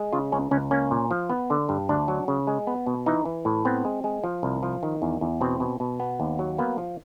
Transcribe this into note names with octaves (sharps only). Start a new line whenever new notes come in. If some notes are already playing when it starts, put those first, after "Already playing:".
Already playing: G#3
C#3 F4
C#2 C#4
C#2 C#4
A#3 C#4
A#2
F3
B3
D3
G2
D2 D4
F#3
C#3
G#3
B3
B2
E3 D#4
E3
A2
B3 C4
G#3
G#3
F3
C2
F3
D#3
E2
E2
B2 C4
B2
B2
B3
D#2
F#3
A#3 B3
F3